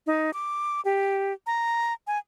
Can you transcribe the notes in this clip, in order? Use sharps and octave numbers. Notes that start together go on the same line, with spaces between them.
D#4
D6
G4
A#5
G#5